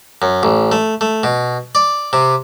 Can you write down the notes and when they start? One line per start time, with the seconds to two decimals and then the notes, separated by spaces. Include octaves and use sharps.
0.22 F#2
0.43 A1
0.72 A3
1.01 A3
1.23 B2
1.75 D5
2.13 C3